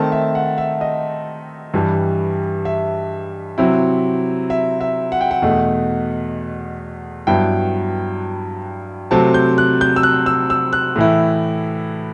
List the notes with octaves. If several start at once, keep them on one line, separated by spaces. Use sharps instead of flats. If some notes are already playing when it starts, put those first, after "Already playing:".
Already playing: D#3 A3 C4 A5
E5
F#5
E5
D#5
G2 E3 G3
E5
C3 F#3 C4 E4
E5
E5
F#5
G5
F#5
E2 B2 A3 D#4
G2 F#3 B3 E4 G5
C3 F#3 A3 C4 A5
G6
F#6
G6
E6
F#6
E6
E6
F#6
A2 E3 A3 E4